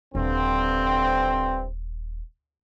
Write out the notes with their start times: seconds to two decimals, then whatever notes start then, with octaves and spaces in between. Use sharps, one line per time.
0.15 D#1 G2 D3 C4